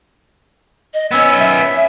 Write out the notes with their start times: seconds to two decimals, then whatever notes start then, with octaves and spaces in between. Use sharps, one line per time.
0.94 D#5
1.11 B3 C#4 E6
1.39 E5